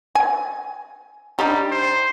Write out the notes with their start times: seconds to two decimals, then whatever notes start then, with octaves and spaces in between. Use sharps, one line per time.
0.15 G#5
1.39 G3 D4 D#4 G4
1.71 C5